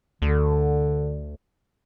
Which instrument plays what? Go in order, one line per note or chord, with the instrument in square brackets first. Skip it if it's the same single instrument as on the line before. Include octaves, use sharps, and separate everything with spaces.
[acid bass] D2 [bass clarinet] D3